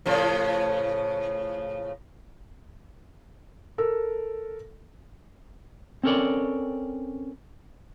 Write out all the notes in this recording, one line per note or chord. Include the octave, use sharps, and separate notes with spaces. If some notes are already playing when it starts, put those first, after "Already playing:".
A2 C#3 F3
A4 A#4 E6
C4 C#4 A4 A#4 C#5 D5